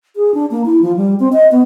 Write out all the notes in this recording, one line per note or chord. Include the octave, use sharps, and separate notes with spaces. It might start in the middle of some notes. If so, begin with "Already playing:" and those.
G#4
D4
A#3
E4
F3
G3
C4
D#5
B3